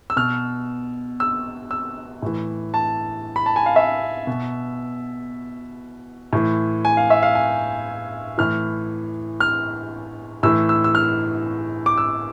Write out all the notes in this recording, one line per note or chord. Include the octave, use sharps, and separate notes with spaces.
E6
B2 F6
E6
E6
A2 E3
A5
B5
A5
G#5
F5
E5
B2
A2 E3
G#5
F5
E5
F5
G#5
A2 E3 F6
F6
A2 E3 E6
E6
E6
F6
D6
E6